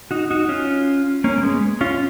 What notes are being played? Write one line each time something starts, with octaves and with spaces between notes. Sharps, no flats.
D#4 F#4
D#4 F#4
C#4 F4
A#3 C#4
A#3
G#3 B3
C#4 F4